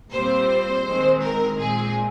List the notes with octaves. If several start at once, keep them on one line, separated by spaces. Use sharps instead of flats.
A#2 G3 C4 C5
D#3 G#3 C4
A#4
A#2 G#3 C4 G#4